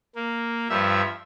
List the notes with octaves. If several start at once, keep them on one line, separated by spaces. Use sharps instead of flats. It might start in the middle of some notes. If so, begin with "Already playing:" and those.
A#3
G2 F3 G3 E5